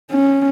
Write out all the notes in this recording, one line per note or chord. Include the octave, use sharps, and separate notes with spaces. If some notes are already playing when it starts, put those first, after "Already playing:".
C#4